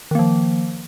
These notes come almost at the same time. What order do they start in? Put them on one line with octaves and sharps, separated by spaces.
D#3 A#3 F3